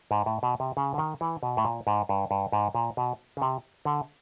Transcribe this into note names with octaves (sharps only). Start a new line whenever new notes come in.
G#2
A2
B2
C3
C#3
D3
D#3
E3
B2
A2
A#2
G#2
G2
G2
G#2
A#2
B2
C#3
C3
D3